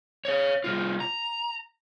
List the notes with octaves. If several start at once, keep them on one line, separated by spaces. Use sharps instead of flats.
C#5 F5
C2 F4
A#5